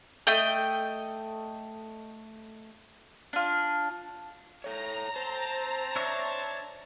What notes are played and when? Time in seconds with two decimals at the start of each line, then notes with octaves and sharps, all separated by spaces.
0.27 A3 D#5 G5
3.33 D4 F4
4.64 A4 C#5 A#5
5.16 C4 C5 A5
5.96 D4 C#5 E5